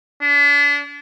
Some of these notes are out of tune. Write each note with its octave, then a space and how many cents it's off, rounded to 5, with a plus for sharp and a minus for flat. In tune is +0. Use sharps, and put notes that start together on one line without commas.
D4 -35